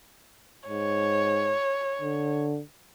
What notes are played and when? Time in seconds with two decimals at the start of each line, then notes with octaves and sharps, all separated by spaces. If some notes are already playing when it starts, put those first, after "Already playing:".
0.68 G#2 C#5
2.02 D3